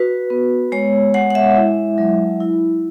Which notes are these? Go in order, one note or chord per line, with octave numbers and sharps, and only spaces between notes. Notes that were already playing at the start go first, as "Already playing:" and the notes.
Already playing: F#4 B4
B3
G#3 C#5
G#3 F#5
F#5
E5
E4
F#3
E4